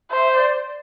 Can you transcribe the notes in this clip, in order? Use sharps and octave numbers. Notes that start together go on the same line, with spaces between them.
C5 E5
D5